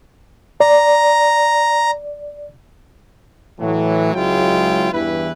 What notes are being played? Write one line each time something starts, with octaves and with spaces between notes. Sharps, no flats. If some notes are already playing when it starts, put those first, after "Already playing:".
D5 A#5
A2 E3 F#3
C#2 F#3 G#3 E4 F4 G5
E2 G2 E3 E4 B4